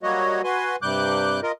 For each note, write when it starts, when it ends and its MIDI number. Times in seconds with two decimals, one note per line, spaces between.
0.03 0.42 54
0.03 0.42 55
0.03 0.42 58
0.03 0.42 66
0.03 0.42 73
0.03 0.42 75
0.44 0.76 66
0.44 0.76 71
0.44 0.76 80
0.44 0.76 84
0.82 1.40 43
0.82 1.40 48
0.82 1.40 55
0.82 1.40 86
0.82 1.40 90
0.82 1.40 91
1.43 1.52 65
1.43 1.52 70
1.43 1.52 75